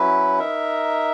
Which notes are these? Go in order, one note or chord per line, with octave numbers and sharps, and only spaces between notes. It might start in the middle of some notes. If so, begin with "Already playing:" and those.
Already playing: F#3 C#4 E4 B4
D#4 A#4 E5